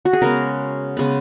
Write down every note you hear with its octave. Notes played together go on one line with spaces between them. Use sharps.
F#4
G#4
C#3 G#3 B3 A#4
C#3 G#3 B3